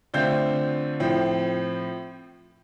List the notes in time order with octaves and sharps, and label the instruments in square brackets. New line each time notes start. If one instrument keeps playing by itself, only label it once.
[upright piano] D3 A3 C4 F4 G6
A2 F3 C4